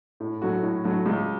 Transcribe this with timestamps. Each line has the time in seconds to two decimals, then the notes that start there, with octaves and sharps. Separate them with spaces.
0.20 A2
0.42 F#3 A3 F#4
0.63 A2
0.84 F#3 A3 F#4
1.06 C#2